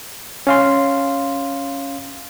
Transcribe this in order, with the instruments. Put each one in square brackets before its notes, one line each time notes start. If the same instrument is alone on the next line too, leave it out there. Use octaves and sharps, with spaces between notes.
[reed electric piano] C#4 F5 C6